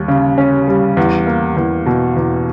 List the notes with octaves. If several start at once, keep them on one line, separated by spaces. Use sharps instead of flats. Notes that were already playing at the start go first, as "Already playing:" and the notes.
Already playing: D#2 G3
C#3
C#4
G3
E2
A#3
E2
B2
E2